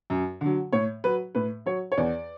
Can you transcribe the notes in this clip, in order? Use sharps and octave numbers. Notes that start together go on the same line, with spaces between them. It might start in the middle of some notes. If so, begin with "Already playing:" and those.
F#2
D3 F#3
A2 C#5
F#3 B4
A2 B4
F#3 C#5
C#5
E2 D5